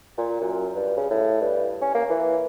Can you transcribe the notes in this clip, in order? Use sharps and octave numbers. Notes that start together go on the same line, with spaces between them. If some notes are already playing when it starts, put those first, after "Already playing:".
A#2
F#2
G2
C#3
A2
G2
C#4
A#3
E3